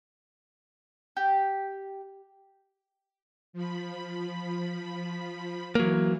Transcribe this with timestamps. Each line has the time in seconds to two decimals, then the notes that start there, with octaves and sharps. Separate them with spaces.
1.17 G4
3.53 F3 B5
5.75 E3 F#3 A#3